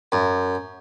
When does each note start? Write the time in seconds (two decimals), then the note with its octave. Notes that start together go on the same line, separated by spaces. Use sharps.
0.12 F#2